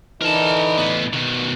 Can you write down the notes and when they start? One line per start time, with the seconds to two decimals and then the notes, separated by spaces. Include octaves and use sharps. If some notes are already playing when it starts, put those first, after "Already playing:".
0.22 D3 E3 D#4 A#4 A5
0.78 A2 B3
1.13 B2 D#3